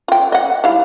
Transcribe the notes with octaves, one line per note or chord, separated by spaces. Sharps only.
F4 G5
D#5 F#5
G3 E4 F5